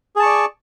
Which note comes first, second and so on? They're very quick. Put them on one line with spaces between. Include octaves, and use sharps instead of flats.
G#4 A5 C#6 D5